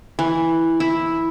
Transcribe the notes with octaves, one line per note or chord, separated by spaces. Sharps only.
E3
E4